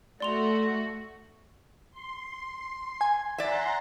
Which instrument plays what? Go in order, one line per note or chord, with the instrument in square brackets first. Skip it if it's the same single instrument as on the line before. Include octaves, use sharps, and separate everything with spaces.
[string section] A3 F#4 [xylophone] D5 C6 F7
[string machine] C6
[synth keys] G#5
[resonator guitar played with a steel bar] D5 E5 [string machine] F#5 A#5 C6